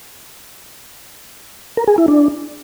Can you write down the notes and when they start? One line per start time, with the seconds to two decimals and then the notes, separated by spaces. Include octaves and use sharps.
1.77 A#4
1.88 G#4
1.98 E4
2.08 D4